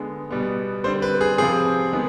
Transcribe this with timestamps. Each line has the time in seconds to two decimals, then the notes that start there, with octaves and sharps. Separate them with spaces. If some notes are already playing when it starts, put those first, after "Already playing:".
Already playing: D3 G#3 B3
0.31 B2 G3 B3
0.84 D3 G3 C4 C5
1.02 B4
1.21 G#4
1.38 C3 F3 C4 G#4
1.93 D#3 G#3 B3